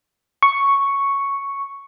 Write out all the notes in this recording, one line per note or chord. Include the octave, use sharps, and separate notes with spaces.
C#6